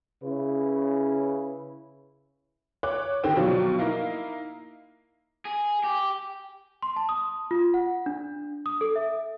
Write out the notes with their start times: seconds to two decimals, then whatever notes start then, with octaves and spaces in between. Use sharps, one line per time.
0.23 C#3 C#4 E4 B4
2.83 C#5 D6 F#6
3.23 D3 D#3 C4 G4
3.36 B2 F3 F#3 D4 F4
3.79 A#3 D#4 E4 F5
5.45 G#4
5.84 G4
6.82 C6
6.96 A5
7.09 D#6
7.51 F4
7.74 F#5
8.06 D4
8.66 D#6
8.81 A4
8.96 E5